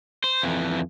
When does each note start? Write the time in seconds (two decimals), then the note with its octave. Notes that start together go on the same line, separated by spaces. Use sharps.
0.24 C5
0.43 F2 E3